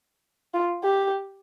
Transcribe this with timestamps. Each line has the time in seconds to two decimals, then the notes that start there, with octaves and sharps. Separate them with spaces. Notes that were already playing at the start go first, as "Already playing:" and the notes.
0.54 F4
0.84 G4